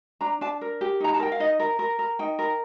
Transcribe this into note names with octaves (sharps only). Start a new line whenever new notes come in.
D4 A#5
D4 A5
A#4
G4
D#4 A#5
A5
A#4 G5
F5
D#4 D#5
A#4
A#4
A#4
D#4 G5
A#4